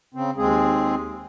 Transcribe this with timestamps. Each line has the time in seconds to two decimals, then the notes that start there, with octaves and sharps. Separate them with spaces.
0.15 C#3 C4
0.37 D#2 G#3 C4 G#4